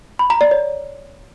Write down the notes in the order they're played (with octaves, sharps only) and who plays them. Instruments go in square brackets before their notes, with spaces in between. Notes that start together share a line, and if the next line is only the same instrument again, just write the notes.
[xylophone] B5
A#5
D5
C#5